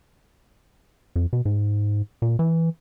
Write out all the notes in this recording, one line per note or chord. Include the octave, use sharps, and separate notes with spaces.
F2
B2
G#2
A#2
E3